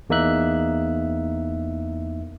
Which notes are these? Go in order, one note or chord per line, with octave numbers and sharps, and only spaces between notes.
E2 A#3 D#4 E5 F#6